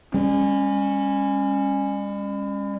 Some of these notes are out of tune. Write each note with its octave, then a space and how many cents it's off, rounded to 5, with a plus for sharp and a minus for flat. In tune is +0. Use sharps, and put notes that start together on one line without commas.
G3 +45 C#4 -10